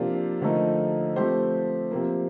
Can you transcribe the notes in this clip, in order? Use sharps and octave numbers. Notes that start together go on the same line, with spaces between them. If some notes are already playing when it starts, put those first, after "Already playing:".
Already playing: C3 F3 A#3 D4 F4
D3 F3 A3 D#4 A#4
F3 A3 C4 G4 C5
C3 F3 A#3